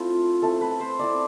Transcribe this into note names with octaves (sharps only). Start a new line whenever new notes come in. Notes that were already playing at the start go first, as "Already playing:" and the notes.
Already playing: A3 C4 E4 F4
A3 C4 E4 A4
B4
C5
A3 C4 E4 D5